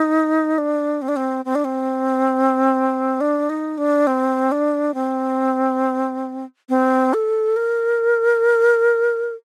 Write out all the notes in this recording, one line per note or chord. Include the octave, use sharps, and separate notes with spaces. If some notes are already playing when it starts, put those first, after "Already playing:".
Already playing: D#4
D4
C4
D4
C4
C4
D4
C4
D4
D#4
D4
C4
D4
C4
C4
A4
A#4